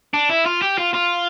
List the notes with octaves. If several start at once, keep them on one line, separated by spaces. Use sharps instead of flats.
D4
E4
F4
G4
F4
F4